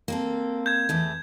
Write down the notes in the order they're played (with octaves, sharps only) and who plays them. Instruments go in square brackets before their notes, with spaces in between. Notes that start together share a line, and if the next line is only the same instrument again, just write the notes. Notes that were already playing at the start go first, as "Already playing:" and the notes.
[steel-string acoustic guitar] A#3 C4 A4
[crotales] G6 G#6
[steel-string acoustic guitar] E2 E3 A3